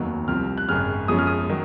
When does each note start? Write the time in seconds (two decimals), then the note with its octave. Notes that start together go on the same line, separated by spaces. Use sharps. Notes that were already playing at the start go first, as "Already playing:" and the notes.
Already playing: F1 D#2 D#3 F#3
0.28 C2 C3 F3 C4 F6
0.57 F#6
0.69 G#1 F#2 C#3 F6
1.08 F#2 F3 G#3 C#4 D#6
1.19 F6
1.27 D#6
1.49 D#3 F#3